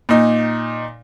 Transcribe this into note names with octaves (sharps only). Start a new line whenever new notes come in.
A#2 D#4